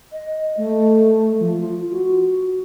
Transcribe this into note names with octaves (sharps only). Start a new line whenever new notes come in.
D#5
A3
F3
F4
F#4